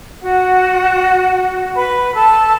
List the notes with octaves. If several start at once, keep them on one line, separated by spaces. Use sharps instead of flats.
F#4 F#5
B4 B5
A4 A5